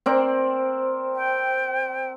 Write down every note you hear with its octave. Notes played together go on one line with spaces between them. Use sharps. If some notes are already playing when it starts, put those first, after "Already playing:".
C4 A#4 C5 D5
G5